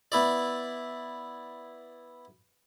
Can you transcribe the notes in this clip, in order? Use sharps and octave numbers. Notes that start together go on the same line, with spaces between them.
B3 E4 D5